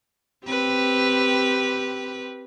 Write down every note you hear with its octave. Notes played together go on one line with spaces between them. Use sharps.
C4 G4 B4